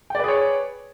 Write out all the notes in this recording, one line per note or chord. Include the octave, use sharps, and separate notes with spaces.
G#4 B4 C#5 D5 G5